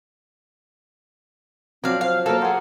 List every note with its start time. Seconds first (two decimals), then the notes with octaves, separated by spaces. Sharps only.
1.84 F3 F#3 C4 D5 F5
2.01 C5 F5
2.26 F#3 A#3 A4 F5
2.42 G#4 C5 F#5